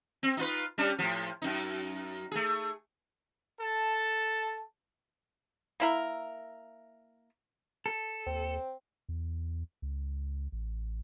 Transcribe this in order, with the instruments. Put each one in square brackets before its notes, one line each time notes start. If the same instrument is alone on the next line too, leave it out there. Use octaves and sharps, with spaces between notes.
[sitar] C4
D#4 F4 B4
G3 C#4 D4
A2 F3
F#2 D#4
A3 G#4
[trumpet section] A4 A5
[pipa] A#3 E4 A#4
[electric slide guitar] A4
[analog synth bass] D#2 [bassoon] C4
[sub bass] E2
C#2
A1